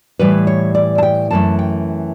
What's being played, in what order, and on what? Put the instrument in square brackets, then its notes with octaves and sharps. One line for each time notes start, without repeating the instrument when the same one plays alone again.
[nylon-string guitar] A2 E3 G3 B4
C#5
D5
A5
G5
F#2 E3 A3 A5
G5